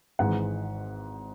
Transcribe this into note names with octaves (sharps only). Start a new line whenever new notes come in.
G#1 G#2 E3 G#3 F#5